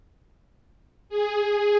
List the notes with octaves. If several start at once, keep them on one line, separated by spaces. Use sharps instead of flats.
G#4